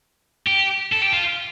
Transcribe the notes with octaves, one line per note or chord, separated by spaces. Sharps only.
G4
A4
G4
F4